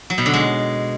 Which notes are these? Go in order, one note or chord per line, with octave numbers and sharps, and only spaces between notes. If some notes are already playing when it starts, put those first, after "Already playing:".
F#3
B2
D3
G#3